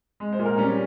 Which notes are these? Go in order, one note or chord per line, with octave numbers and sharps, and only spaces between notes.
G#3
C5
A#2
A#4
G3 C#4